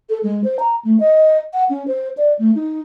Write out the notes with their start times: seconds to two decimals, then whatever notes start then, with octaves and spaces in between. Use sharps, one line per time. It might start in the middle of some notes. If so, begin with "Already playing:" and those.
0.10 A4
0.23 G#3
0.44 C5
0.59 A#5
0.85 A3
1.00 D#5
1.54 F#5
1.69 C#4
1.88 C5
2.17 D5
2.39 A3
2.55 D#4